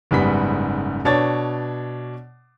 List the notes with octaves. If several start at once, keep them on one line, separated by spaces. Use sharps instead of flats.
F#1 G#2 G3 B3 B6
B2 D4 C#5 A5 A6